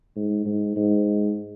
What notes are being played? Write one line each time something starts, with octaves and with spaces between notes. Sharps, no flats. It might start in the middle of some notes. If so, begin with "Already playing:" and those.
G#2
G#2
G#2